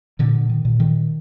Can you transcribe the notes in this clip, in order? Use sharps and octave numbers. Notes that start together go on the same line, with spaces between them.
A#2 D3
D#3
A#2
D#3